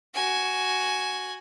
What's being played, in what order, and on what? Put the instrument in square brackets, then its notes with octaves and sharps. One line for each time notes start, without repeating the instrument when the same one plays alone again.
[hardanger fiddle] F#4 G#5